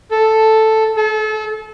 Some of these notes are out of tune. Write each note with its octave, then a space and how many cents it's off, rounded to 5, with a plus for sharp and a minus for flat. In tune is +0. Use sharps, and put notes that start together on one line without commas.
A4 +0
A4 -35